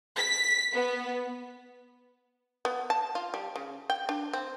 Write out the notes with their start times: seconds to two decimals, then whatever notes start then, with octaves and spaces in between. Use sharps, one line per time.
0.18 B6
0.74 B3
2.65 B3
2.90 A5
3.15 F4
3.34 G3
3.56 C#3
3.90 G5
4.09 D4
4.33 C4